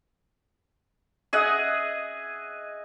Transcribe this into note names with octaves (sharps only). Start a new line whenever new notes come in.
G#4 D#5 E5 F#5